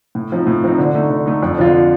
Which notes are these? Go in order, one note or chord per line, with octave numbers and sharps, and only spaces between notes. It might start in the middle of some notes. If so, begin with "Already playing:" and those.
A2
F3 C4 D#4
A2
F3 C4 D#4
D3
A3 D#4
D3
A3 D#4
F2
D3 F3 C4 F4